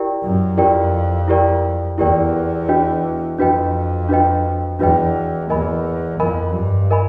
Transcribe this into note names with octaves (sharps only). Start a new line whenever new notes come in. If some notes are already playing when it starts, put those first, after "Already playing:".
Already playing: E4 G4 A#4 D5 G5
F#2
F2 E4 G4 A#4 D5 G5
E4 G4 A#4 D5 G5
E2 E4 G4 A#4 D5 G5
D4 F#4 B4 D#5 G5
F2 D4 F#4 B4 D#5 G5
D4 F#4 B4 D#5 G5
E2 D4 F#4 B4 D#5 G5
E2 A#4 D#5 G#5 B5
F2 A#4 D#5 G#5 B5
G2
A#4 D#5 G#5 B5